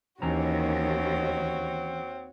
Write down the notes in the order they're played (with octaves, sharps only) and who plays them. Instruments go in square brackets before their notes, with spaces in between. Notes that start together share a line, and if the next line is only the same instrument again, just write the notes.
[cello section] D#2 [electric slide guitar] E3 C#4 A#5 [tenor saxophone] C4 [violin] F#4 C#5